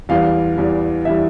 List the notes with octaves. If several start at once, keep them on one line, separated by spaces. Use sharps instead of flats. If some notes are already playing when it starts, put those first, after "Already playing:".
E2 E3 G3 F5
E2 E3 G3
E3 G3 E5